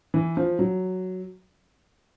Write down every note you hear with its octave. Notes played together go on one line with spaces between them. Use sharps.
E3
F3
F#3